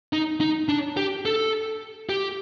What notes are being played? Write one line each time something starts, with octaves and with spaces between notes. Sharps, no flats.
D#4
D#4
D4
G4
A4
G4